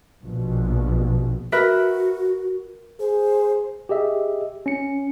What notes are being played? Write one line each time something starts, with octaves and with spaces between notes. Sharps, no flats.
A#1 B2
F#4 A#4 B4 E5
G#4 C5
G4 G#4 D#5 E5
C#4 C#7